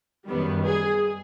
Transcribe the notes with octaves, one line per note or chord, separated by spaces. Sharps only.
F#2 D#3 G3 B3
G#4